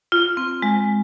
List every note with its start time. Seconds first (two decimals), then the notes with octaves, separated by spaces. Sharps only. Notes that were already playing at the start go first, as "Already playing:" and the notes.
0.12 F4
0.37 C4
0.62 G#3